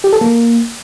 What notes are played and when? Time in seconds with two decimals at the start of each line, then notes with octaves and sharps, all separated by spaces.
0.04 G4
0.13 A4
0.21 A#3